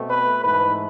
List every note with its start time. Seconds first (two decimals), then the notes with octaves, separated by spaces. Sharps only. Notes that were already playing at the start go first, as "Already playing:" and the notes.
Already playing: B2 A3 C4
0.09 B4
0.42 G#2 E3 A3 B4